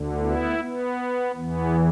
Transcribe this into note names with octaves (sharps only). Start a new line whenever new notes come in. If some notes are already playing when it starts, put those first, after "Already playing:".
Already playing: D2 D3
B3 E4
B3
E2 E3 B3